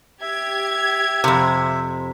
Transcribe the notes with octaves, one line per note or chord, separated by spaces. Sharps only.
G4 E5 G#6
F2 C3